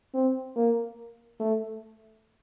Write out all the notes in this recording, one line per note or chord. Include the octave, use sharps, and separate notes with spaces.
C4
A#3
A3